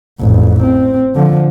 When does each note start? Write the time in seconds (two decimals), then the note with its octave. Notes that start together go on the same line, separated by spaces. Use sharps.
0.20 A1 F2
0.63 C4
1.15 D3 F3